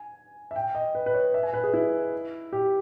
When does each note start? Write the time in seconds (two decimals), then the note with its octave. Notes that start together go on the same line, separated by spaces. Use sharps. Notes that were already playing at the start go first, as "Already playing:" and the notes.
Already playing: G#5
0.51 E5
0.56 G5
0.75 D#5
0.95 B4
1.06 B4
1.14 C#5
1.34 E5
1.43 G#5
1.54 B4
1.64 G#4
1.74 E4
2.53 G4